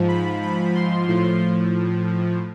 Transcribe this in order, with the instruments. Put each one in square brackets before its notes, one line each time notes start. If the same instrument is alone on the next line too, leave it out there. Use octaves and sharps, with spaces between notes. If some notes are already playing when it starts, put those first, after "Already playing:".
Already playing: [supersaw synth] G#2 F3
B5
B5
C6
A2 F3